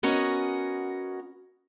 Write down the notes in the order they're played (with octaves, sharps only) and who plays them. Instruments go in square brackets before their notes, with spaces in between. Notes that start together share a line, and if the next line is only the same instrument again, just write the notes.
[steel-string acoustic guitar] B3 C#4 F#4 A#4 D#5